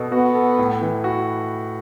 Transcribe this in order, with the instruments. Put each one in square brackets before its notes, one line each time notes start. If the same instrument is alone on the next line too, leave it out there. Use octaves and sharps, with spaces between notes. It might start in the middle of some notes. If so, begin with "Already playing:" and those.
Already playing: [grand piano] B2 A4
[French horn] B3 [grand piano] F#4
[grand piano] A4
A2
E3
F#4